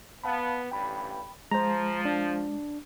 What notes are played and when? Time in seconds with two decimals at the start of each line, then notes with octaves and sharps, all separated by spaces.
0.24 B3 F5 A5 B5
0.71 A1 G2 G5 B5
1.51 F3 G#3 C5 A#5
2.05 D4